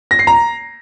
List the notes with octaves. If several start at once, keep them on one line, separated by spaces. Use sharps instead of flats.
A#6
C7
A#5